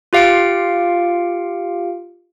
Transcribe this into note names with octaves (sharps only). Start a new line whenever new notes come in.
F4 G4 F5 C#7 D7